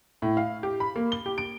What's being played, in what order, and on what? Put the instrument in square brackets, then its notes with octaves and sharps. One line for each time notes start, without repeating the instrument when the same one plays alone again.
[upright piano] A2
F5
G4
B5
A#3
G7
G4
D7